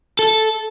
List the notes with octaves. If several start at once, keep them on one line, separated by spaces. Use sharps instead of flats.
A4